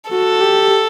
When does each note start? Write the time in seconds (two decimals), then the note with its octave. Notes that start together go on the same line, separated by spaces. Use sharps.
0.11 F#4 A4
0.41 G4